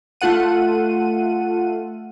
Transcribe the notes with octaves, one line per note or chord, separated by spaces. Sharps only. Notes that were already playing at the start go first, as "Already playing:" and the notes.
A3 F4 A4 F#5 D#7